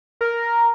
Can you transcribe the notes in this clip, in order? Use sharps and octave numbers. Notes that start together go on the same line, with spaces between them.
A#4